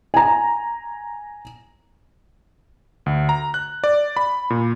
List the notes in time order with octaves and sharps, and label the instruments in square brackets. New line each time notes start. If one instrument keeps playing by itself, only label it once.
[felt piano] G#5 A#5
[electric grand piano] D2
A#5
F#6
D5
B5
A#2